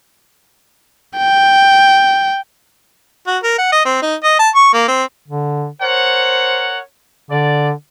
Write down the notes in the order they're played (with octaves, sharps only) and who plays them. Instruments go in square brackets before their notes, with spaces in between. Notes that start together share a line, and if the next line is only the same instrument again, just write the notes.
[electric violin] G5
[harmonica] F#4
A#4
F#5
D#5
C4
D#4
D#5
A5
C#6
A#3
C4
[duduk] D3
[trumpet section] A#4 C#5 F#5 [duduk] C5
[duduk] D3 [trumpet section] D5